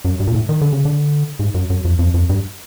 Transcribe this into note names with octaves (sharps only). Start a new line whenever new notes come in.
F#2
G2
A#2
A2
D#3
D3
C#3
D3
G#2
F#2
F#2
F2
F2
F2
G2